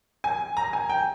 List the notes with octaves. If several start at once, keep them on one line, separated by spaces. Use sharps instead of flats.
G#5
A#5
G#5
G5